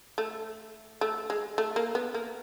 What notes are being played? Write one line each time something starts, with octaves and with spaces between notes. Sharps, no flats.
A3
A3
G#3
A3
A#3
B3
A#3